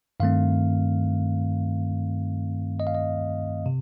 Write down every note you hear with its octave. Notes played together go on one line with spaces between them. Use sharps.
G2 D#3 A3 C4 F5
D#5
F5
D#5
C3